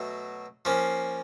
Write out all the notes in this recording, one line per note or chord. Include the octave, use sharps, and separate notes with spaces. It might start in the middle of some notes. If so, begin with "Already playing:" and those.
Already playing: B2 F#3 A3
F3 A#3 C#4